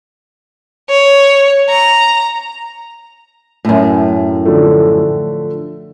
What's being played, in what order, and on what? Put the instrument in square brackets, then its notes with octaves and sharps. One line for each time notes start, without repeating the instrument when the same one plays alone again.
[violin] C#5
A#5
[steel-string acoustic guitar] F#2 A2
[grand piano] D3 F3 A3